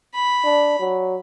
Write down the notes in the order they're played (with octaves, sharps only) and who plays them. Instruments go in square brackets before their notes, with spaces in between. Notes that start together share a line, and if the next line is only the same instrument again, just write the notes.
[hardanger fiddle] B5
[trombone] D4
F#3